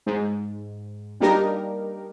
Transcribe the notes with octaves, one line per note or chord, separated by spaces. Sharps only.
G#2
G3 A#3 D4 D#4 G4 A#4